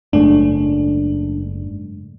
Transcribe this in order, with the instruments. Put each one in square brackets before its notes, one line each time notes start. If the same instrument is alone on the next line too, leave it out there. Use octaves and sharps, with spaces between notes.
[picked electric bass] F#1 G#2 A3 [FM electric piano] D4